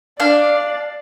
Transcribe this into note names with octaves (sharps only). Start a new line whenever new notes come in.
D4 D5 F5